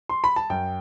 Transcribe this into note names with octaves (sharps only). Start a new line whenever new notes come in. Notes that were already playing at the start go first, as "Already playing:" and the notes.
C6
B5
A5
F#2 G5